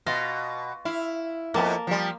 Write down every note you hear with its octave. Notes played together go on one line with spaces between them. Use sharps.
B2 F4 D#5 F5
E4 F5
F2 A#3 B3 A5
F3 G3